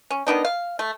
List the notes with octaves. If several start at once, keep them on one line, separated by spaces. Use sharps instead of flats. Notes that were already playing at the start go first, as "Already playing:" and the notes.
C#4
D#3 B3 D4 D#4
F5
A3